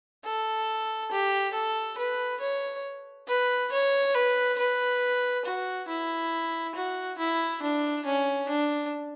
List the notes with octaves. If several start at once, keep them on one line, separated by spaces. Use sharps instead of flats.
A4
G4
A4
B4
C#5
B4
C#5
B4
B4
F#4
E4
F#4
E4
D4
C#4
D4